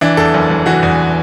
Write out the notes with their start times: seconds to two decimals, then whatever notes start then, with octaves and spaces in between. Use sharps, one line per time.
0.01 E3 D4
0.17 E2 A4
0.34 F#1
0.50 F#1
0.66 E3 F#4
0.83 E2